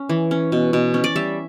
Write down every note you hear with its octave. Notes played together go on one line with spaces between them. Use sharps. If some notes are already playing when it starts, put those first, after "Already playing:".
Already playing: C#4
E3
C#4
B2
B2
C#4
D5
G3 E5